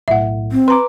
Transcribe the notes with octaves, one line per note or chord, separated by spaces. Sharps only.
B1 A2 E5 F#5
C4
B4 A#5 C6 D6